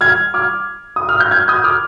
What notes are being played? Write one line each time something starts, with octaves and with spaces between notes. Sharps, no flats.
F6 G#6
D6 F6
D#6
F6
G6
F6 G#6
D#6 G6
D6 F6